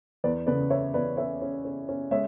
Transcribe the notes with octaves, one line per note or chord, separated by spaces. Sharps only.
E2 B4 D5
C#3 B4 D5
C#4 C#5 E5
E2 B4 D5
C#4 C#5 E5
C#4
C#4
C#4
G#3 C#5 E5